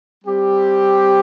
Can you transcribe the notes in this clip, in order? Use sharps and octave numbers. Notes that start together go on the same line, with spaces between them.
G3 C4 G4